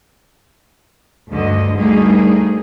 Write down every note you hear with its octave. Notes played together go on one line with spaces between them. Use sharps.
D2 G2 D3 D#5
D2 G3 A3 A#3 D#4 G#4